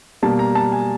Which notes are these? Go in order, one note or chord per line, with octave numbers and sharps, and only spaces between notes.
B2 G3 A#3 A5
A#5
A5
G#5